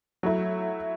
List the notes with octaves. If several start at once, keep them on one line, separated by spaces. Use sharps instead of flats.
F#3 A3 E4